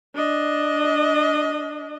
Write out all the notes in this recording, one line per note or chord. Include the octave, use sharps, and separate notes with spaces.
D4 D#5